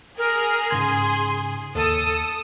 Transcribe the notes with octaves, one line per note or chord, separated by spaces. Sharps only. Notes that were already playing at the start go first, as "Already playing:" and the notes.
G#4 A#4
G#2 C#3 C6 G#6
D#2 A4 D#6